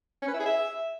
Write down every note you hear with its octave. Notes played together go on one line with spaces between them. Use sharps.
C#4
B4
E4
G#4
E5